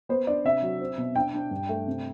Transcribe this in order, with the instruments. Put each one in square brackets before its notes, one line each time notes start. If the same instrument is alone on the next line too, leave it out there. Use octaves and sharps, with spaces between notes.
[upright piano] B3 C5
D4 D5
C3 E5
F#3
C4
B2
D4 G5
D4
G2
A3
C3